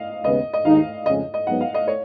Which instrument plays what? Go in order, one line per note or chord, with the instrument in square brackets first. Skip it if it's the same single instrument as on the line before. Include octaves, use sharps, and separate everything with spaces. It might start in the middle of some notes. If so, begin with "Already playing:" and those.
Already playing: [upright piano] D#5 F5
[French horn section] D#2 C#3 G#3 B3 [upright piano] D#5
[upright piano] D#5
[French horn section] D#2 D#3 G#3 D#4 [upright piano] F5
[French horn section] F2 C#3 G#3 C#4 [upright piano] D#5
[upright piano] D#5
[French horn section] G#2 F#3 B3 [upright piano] F#5
[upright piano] F5
D#5
C#5